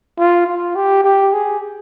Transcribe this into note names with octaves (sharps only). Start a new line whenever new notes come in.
F4
F4
G4
G4
G#4